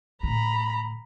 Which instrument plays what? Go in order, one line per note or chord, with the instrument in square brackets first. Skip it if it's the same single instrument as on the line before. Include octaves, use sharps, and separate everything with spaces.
[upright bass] A2 D3 [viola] A#5 B5